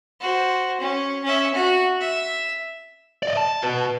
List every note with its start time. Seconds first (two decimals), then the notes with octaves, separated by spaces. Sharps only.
0.20 F#4 C5
0.80 C#4
1.24 C#4 E5
1.54 F#4
2.01 E5
3.23 D5 D#5
3.37 A5
3.63 F#4 B4